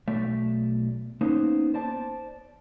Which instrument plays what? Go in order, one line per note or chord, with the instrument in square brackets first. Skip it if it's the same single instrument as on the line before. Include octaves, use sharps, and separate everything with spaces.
[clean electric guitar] B1 A3 D5 E5
A#3 B3 C#4 D#4 C5
C5 D5 A5